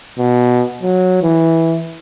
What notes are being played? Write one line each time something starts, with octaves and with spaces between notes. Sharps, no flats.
B2
F#3
E3